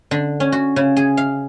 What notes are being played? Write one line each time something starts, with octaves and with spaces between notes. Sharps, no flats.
D3
C#4
F#4
C#3
G#4
F5